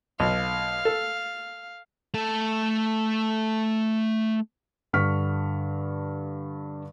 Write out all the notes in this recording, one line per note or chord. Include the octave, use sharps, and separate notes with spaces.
B1 F5
A4
A3 A4
G2 D3 C#6 F6 B6